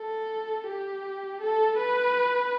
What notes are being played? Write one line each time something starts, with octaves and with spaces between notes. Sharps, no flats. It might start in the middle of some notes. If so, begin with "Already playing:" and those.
Already playing: A4
G4
A4
B4